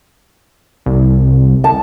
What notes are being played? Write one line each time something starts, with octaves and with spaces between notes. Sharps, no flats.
C2
A5